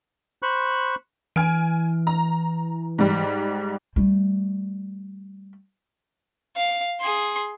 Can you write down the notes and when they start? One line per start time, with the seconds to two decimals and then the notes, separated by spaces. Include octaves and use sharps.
0.42 C5 B5 C#6 F#6
1.36 E3 G#5 F6 D7
2.07 A#5
2.98 G#2 G3
3.96 G3 A3
6.57 F5
7.00 G#4 C6